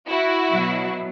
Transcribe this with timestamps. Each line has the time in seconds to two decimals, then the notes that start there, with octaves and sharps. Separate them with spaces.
0.10 E4 F#4
0.51 B2 F#3